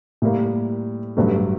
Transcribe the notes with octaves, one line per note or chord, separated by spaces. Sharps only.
A2 G3 A#3
A1 G2 F#3 A3